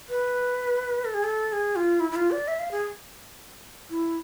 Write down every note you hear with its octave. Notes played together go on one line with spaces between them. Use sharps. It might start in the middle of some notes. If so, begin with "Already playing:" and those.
B4
A4
G#4
A4
G#4
F4
E4
E4
F4
D5
E5
F5
G#4
E4